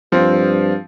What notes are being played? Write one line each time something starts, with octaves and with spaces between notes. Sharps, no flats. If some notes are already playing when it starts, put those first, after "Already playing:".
G2 F3 C4